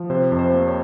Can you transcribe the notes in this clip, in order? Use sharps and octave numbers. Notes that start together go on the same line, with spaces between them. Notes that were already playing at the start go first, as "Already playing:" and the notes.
Already playing: F3
C3 C5
F2
C5
A#3
C#5